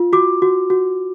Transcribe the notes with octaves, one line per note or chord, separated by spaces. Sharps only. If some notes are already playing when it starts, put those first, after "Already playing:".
Already playing: F4
F#4 D6
F#4
F#4